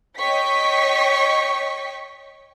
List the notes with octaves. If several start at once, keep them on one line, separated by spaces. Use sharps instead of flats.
C#5 D#5 G5 C#6 B6